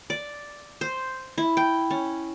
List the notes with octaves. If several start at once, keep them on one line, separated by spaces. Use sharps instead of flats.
D5
C5
E4
G5
C#4